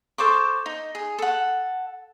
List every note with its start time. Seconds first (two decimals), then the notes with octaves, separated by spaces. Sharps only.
0.18 A4 C5 C#6 D6
0.66 D#4
0.95 G#4
1.18 A4 F#5